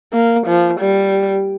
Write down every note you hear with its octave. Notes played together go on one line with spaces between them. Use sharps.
A#3
F3
G3